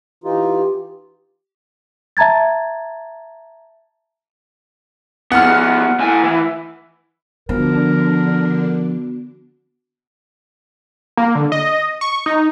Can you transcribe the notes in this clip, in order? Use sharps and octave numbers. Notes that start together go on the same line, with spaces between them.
E3 D#4 F4 G4
E5 A5 A#5 G#6 A6
F3 B3 F#5 F6
A2 G#5
E3
D3 F3 B3 D4 F#4 A#4
A#3
D3
D#5
C#6
D#4